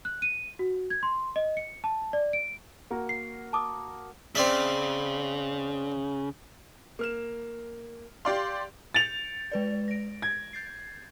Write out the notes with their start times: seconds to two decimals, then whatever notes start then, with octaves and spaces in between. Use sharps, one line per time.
0.05 F#6
0.22 D#7
0.59 F#4
0.90 G#6
1.03 C6
1.36 D#5
1.57 C#7
1.84 A5
2.13 D5
2.33 D7
2.91 A#3 F#4 A#4
3.09 C7
3.53 A5 D6 D#6
4.35 C#3 C4 D5 E5
6.99 A#3 F6 E7
8.25 G4 D5 F5 C6 G6
8.94 G6 A6 C#7 D7 F7
9.52 G#3 B4 D5
9.88 A#6 D7
10.22 G#6
10.53 G6 A6 C7